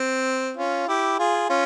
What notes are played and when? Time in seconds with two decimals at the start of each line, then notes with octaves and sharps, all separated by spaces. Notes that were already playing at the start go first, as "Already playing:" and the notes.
Already playing: C4
0.57 C#4 F4
0.87 E4 G4
1.19 F4 G#4
1.49 C#4 F4